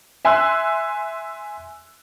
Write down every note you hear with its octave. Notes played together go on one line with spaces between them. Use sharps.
E5 G#5 C6 E6 F#6